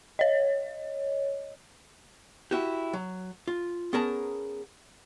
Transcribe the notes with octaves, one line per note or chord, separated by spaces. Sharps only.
C#5 D#5
E4 F#4 G4
F#3
F4
B3 C#4 G#4 A#4 A5 A#5